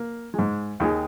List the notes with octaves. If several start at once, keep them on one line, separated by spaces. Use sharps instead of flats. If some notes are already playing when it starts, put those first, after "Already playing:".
Already playing: A#3
G#2 G#3
D#2 D#3 G#3